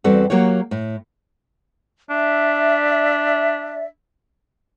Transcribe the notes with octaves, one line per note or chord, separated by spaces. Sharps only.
E2 G3 C4 F#4 A4
F#3 A#3 F#4 G4 C#5
A2
D4 D5 E5